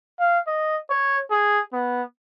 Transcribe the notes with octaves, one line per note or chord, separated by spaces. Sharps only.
F5
D#5
C#5
G#4
B3